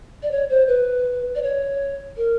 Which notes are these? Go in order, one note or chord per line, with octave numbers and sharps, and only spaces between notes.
D5
C#5
C5
B4
D5
C#5
A#4